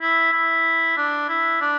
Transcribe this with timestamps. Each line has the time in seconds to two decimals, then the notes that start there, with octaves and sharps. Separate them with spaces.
0.01 E4
0.32 E4
0.97 D4
1.29 E4
1.61 D4